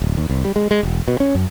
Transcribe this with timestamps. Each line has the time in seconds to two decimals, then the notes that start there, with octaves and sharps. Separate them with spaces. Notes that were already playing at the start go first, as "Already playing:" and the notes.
0.02 D1
0.17 D#2
0.30 C2
0.45 G3
0.56 G#3
0.71 G#3
0.83 E1
1.08 B2
1.20 C#4
1.35 F#2